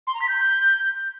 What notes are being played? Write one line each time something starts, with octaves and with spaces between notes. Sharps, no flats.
C6
A#5
B6
G6